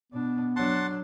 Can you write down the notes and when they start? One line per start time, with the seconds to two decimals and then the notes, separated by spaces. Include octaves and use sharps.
0.12 B2 B3 D4
0.56 F#3 D4 F#5 A5 C6